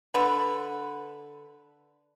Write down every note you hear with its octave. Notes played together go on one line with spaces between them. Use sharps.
D3 B4